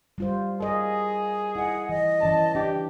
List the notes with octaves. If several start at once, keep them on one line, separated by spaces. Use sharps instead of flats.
G3 F4 C5
G#4 A#4 D#5
E4 D#5 F#5
E3 D#5
E3 C#4 D5 A5
D4 G4